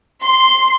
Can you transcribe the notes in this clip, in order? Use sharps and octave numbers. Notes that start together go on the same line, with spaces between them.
C6